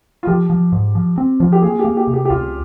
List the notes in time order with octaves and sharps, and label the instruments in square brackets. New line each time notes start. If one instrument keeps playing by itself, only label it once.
[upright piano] F4
[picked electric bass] F3 [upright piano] G4
[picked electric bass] F3
G#2
F3
C4
[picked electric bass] F3 [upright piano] F4
[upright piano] G4
[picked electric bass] A#3 [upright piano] G#4
[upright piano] G4
[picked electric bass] A#3
[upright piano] G4
[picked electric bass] C3
[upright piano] G4
G4
[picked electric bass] C#2 [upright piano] F4